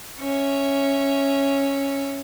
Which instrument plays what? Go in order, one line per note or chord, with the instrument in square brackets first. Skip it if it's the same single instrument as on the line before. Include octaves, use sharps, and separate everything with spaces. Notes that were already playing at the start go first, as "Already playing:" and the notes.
[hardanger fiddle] C#4 E5